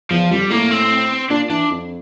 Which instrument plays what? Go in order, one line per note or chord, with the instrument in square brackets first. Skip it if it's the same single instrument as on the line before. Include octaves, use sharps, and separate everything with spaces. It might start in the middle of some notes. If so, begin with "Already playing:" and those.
[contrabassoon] E2 [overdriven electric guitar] F3
[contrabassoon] F2 [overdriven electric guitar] G3
[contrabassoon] A2 [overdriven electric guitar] A#3
[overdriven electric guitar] C4
[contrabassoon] A#2 [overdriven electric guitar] D4
[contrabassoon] E3 [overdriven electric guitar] D4
[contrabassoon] F2